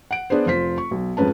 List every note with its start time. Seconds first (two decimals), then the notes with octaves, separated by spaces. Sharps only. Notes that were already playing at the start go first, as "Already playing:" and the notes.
0.11 F#5 D7
0.30 B3 D4 G#4 B4 C5
0.46 F1 F4 C5 B6
0.78 C#6
0.91 B1
1.17 F2 G#2 C#4 B4 A5